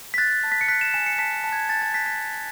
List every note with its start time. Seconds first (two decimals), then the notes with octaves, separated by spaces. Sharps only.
0.14 B6
0.18 F#6 A6
0.43 A5
0.52 B6
0.61 C#7
0.68 F#6 B6
0.81 E7
0.94 G#5 E7
1.06 C#7
1.18 A5 B6
1.44 A5
1.52 G#6
1.69 G#5 A6
1.82 A6
1.94 F#6 B6
2.06 B6
2.19 A5